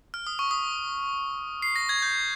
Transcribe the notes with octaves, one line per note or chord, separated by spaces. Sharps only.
F6
D#6
C#6
D#6
C7
A#6
G#6
G6